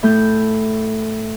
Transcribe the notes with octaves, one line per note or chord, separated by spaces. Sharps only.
A2 A3 G6